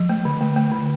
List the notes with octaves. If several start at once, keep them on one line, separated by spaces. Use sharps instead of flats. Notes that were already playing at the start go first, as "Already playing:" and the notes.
Already playing: F3
A3
D3
A3
A3
D3